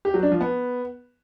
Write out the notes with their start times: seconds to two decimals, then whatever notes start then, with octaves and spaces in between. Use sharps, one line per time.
0.05 G4
0.14 F#3
0.23 D4
0.32 F3
0.41 B3